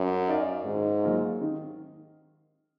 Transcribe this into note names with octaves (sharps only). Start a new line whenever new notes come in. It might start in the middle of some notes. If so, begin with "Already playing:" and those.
Already playing: F#2
D#4 A#4 D5 F5
G#2 D#3
F#3 A#3 F4
D#3